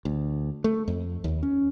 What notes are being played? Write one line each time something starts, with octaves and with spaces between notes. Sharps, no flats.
D2
A3
F2
D#2
C#4